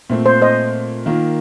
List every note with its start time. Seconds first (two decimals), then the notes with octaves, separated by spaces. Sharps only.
0.10 A#2 A3 C4
0.26 C5
0.42 C5 D#5
1.06 D#3 A#3 F4